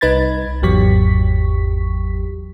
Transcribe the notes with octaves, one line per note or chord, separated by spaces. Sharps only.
C2 D#4 B4 B5 G#6 A6
G#1 E2 F#3 G4 C#6 B6